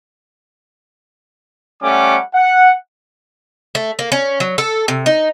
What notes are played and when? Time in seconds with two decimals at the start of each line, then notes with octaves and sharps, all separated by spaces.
1.83 G3 A3 C#4 F#5 D6
2.35 F#5
3.75 A3
3.99 A#3
4.12 C#4
4.40 F#3
4.58 A4
4.88 C3
5.06 D#4